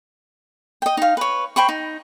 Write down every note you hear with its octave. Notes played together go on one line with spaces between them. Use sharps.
D#5 G5
D#4 F5
B4 C#5
C5 G5 B5 C#6
D#4